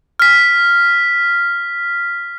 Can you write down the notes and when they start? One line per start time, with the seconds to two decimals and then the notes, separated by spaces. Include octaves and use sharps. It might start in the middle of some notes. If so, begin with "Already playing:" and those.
0.20 F6 B6